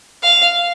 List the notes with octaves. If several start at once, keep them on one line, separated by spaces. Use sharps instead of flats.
F5